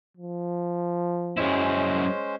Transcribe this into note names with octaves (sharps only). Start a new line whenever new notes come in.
F3
F#2 G#3 C#4 E4 C5